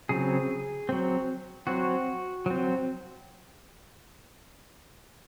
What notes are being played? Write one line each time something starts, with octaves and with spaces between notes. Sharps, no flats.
C#3 F#3 C4 G#4
F#3 C4
F#3 C4 F#4
F#3 C4